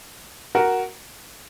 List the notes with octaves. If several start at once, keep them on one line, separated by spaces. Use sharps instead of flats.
F#4 A#4